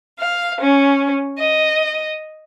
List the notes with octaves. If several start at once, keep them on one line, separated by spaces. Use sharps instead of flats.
F5
C#4
D#5